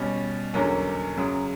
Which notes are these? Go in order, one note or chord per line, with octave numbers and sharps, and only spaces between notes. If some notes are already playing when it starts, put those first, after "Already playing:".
Already playing: B2 G3 C#4
E2 D3 F#3 A#3 C#4
F#2 C#3 F#3